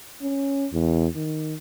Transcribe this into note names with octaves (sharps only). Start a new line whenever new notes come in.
C#4
E2
D#3